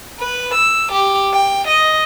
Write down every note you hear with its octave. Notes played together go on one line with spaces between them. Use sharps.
B4
E6
G4
G5
D#5